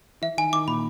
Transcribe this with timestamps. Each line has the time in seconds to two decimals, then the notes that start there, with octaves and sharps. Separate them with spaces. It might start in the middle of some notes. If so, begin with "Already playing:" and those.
0.22 E3 E4 E5
0.38 D#3 D#4 G#5
0.53 D#3 D#4 D6
0.68 A#2 A#3 B5